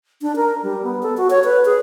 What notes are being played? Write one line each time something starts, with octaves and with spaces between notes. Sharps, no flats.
D4
A#4
G3
B3
A4
F#4
C#5
B4
G#4